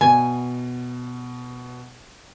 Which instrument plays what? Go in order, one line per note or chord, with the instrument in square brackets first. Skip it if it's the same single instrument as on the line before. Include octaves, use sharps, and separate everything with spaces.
[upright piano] B2 [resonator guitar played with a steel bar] G#5